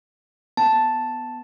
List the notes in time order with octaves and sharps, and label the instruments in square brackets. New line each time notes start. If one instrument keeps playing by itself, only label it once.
[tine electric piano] B3 [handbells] A5